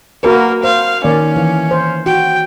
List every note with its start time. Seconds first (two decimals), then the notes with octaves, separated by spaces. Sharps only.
0.23 A#3 F#4 A#4 B4
0.64 C5 F5
1.04 D#3 A#3 C#4 D5
1.36 E3
1.71 C5
2.06 F#4 G5